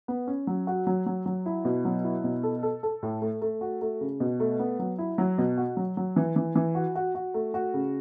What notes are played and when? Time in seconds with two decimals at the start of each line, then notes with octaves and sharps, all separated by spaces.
0.08 B3
0.27 C#4
0.47 F#3
0.67 F#4
0.87 F#3
1.06 F#3
1.26 F#3
1.46 E4
1.65 B2
1.85 F#3
2.04 E4
2.24 B2
2.43 A4
2.63 A4
2.83 A4
3.03 A2
3.21 A3
3.42 A3
3.61 F#4
3.81 A3
4.01 C#3
4.20 B2
4.40 A3
4.59 B3
4.79 F#3
4.98 E4
5.18 F#3
5.38 B2
5.58 F#4
5.77 F#3
5.97 F#3
6.16 E3
6.36 E3
6.56 E3
6.75 F#4
6.95 F#4
7.15 F#4
7.34 A3
7.54 F#4
7.74 C#3